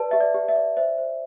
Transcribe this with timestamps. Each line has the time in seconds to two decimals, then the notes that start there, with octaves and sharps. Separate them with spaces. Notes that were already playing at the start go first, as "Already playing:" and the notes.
Already playing: G4 B4 D5 A5
0.11 G4 E5
0.21 D5
0.34 G4
0.48 E5
0.56 D5
0.77 C5 E5
0.98 C5